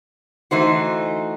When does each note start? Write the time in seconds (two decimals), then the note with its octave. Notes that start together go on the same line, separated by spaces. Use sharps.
0.51 E3 A3 D#4 F#4 C5